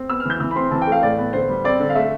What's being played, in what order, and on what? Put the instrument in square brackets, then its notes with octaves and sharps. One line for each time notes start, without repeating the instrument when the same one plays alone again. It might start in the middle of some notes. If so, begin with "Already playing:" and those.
Already playing: [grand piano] C4
B3 E6
F6
E3 G6
E3 E6
B5
C4 C6
E3 A5
G5
A3
F5
A2 D5
B3
D3 C5
G3
C4 D5
D3
F5
A3 E5